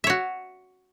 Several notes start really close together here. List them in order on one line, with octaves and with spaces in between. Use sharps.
E5 C#5 F#4